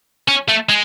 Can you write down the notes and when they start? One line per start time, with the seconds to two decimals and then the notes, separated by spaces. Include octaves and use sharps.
0.28 C#4
0.48 A3
0.69 G#3